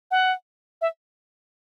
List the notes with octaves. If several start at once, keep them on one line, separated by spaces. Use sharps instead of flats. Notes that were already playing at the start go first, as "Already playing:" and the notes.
F#5
E5